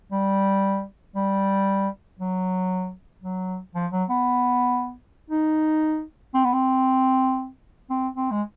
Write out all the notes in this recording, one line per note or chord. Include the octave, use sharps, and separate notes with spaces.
G3
G3
F#3
F#3
F3
F#3
B3
D#4
C4
B3
C4
C4
C4
G#3